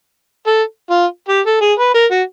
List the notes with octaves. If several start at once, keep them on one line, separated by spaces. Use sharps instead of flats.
A4
F4
G4
A4
G#4
B4
A#4
F#4